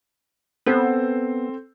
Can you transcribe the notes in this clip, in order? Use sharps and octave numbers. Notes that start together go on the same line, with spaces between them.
B3 C4 A4 C5